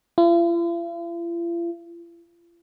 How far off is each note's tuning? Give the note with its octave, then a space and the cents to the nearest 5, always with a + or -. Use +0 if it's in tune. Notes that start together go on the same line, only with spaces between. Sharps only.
F4 -45